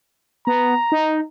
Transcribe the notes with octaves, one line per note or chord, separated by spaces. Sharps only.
B3 A#5
D#4